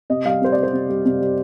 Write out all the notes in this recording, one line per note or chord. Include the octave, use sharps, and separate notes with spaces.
C3 D#5
G3 F5
C3 C5
D5
G3
C5
C3
G3
C3
G3